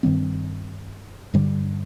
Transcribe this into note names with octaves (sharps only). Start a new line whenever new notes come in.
G2 D#3 G3 C4
G2 D3 G3